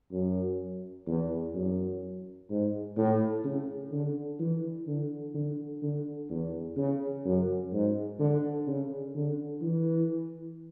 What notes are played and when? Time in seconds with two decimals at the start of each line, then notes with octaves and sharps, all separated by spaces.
0.12 F#2
1.07 E2
1.54 F#2
2.50 G#2
2.97 A2
3.44 C#3
3.92 D3
4.39 E3
4.87 D3
5.34 D3
5.82 D3
6.30 E2
6.77 C#3
7.25 F#2
7.72 G#2
8.19 D3
8.67 C#3
9.15 D3
9.61 E3